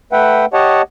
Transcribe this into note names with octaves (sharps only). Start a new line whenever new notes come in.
A3 B4 E5 F#5 G5
G4 C#5 D#5 F#5 A5